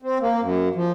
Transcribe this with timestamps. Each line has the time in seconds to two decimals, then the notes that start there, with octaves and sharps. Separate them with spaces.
0.02 C4
0.21 A#3
0.41 F#2
0.75 F3